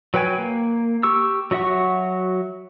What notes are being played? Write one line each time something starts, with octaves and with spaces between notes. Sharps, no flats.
F#3 B4 G5 G#5
A#3
G4 C#6 E6
F#3 F#4 E5 F#5 C#6